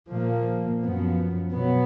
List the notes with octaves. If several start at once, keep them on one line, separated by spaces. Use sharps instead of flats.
A#2 F3 A#3
F#2 F3 B3
B2 F#3 B3